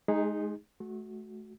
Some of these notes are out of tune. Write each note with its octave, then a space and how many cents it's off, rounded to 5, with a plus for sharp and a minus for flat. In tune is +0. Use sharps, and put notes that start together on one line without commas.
G#3 +25 D#4 +0 G#4 -25
A3 -30 F#4 +0